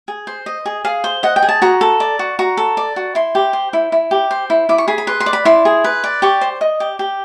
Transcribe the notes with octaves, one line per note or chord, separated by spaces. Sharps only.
G#4
C5
D#5
G#4
G#4 F5
C5
D#5 F#5
G5
G#4
A5
F#4 A#5
A4
D5
F#4
F#4 A#5
A4
D5
F#4
E4 C6
G4
C5
E4
E4
G4
C5
E4
E4 D6
C#6
G#4 B5
B5
B4 C6
C6
D5
B5
E4 C6
G#4
B4
D5
G4 C#6
C5
D#5
G4
G4